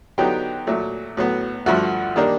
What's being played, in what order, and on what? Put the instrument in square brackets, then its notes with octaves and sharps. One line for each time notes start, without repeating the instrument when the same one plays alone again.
[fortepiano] D3 F#3 B3 D#4 G4 G5
A#2 F#3 A3
A2 F#3 B3
G2 D3 F3 A3 F#4 F#5
D#3 G3 A#3 D4